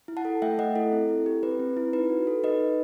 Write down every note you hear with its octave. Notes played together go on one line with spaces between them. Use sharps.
E4
F#5 A5
A4
A3 E5 G5
A3 D#5 F#5
E4 A4
C4
E4
G4
C4 B4
C4
E4
D#4 B4
F#4
A4
D#4 B4 D#5
D#4